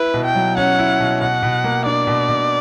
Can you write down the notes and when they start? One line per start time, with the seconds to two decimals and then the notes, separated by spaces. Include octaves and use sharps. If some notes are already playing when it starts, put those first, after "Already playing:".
Already playing: E4 B4
0.14 B2
0.25 G5
0.35 F#3
0.57 C#4 F#5
0.79 E4
1.00 B2
1.21 B2 F#5
1.43 B2
1.64 A#3
1.86 D4 D5
2.07 B2
2.29 B2